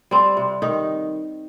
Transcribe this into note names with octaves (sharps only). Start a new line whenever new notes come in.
G3 C4
C3
D#3 D#4